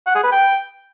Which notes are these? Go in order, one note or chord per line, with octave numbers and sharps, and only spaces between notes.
F#5
G#4
B4
G5